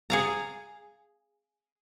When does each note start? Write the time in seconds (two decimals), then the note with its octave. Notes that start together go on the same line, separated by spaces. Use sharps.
0.10 G#4 F5 A#5